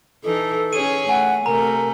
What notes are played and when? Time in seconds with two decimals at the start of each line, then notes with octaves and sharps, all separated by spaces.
0.24 E3 D#4 A4
0.73 C#4 G#4 C#5 D#7
1.09 A3 F#5 G#5
1.46 C3 A3 A#4 A#5